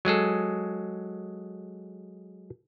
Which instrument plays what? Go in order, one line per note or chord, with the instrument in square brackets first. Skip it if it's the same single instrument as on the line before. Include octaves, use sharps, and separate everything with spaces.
[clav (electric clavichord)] F#3 G#3 G#4 A4